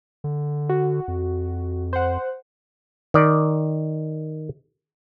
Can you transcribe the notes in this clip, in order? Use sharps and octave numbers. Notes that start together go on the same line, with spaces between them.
D3
F#4
F2
C5 F#5
D#3 D5